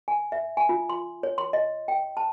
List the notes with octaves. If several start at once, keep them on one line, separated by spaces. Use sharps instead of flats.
G#5
E5
G#5
F4
C6
C#5
C6
D#5
G5
A5